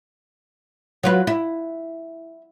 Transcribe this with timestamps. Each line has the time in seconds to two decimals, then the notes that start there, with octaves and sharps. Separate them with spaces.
1.04 F#3 F4 B4
1.27 E4